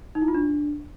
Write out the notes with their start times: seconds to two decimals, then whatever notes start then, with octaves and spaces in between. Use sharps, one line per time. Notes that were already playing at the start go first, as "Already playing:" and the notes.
0.15 D#4
0.22 E4
0.28 F4
0.35 D4